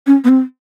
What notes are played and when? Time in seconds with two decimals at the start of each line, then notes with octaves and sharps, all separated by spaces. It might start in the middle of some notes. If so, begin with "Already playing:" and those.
0.07 C#4
0.24 B3
0.29 C4